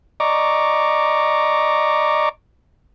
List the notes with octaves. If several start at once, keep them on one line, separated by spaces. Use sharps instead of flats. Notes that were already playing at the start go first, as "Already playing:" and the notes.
D5 D#5 A#5 C#6 D6